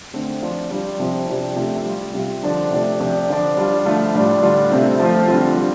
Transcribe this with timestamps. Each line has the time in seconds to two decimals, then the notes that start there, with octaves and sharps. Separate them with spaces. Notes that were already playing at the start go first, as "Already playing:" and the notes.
0.14 D3 A3 C4
0.42 F3 D4 F4
0.71 G3 D4 F4
0.99 C3 F3 C4 F4
1.28 C3 F3 D4 G4
1.56 C3 A3 F4
1.85 G3 F4
2.14 C3 G3 F4
2.43 D3 F3 D4 G4
2.71 C3 A3 D4
3.00 C3 F3 D4 G4
3.29 D3 F3 D4
3.57 G3 D4 F4
3.85 D3 F3 A3 F4
4.14 A2 G3 D4
4.42 D3 G3 D4 F4
4.72 C3 A3 C4
4.99 F3 A3 C4 F4
5.28 D3 G3 C4 F4
5.57 G3